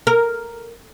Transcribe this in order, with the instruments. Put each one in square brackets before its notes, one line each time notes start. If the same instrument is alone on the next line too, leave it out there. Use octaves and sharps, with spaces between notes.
[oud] A#4